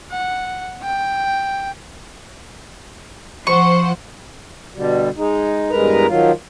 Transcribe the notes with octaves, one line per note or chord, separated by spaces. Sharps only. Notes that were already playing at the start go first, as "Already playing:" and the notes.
F#5
G5
F3 C5 F#5 C#6
B2 D3 G3
G#3 D#4
E2 G2 G#3 A#4 B4 A#5
D#3 F3 F#3 F4